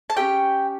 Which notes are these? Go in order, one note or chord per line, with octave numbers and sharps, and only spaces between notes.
A5
C#4 E4 G4 G5